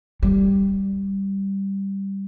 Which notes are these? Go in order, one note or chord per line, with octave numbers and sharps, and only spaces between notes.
G3